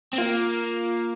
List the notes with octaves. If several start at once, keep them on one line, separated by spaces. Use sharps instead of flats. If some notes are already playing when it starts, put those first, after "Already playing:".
C4
A#3 F4